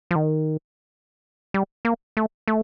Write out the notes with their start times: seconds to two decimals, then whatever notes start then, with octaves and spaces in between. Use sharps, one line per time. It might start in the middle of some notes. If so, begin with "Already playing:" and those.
0.11 F3
0.16 D#3
1.54 G3
1.85 A#3
2.17 A3
2.48 A3